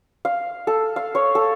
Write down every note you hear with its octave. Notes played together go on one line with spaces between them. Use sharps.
F5
A4
F5
C#5
A4